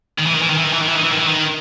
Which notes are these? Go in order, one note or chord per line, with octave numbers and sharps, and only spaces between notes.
D#3
E3
D#3
E3
D#3
E3
D#3
E3
D#3
E3
D#3
E3
D#3
E3
D#3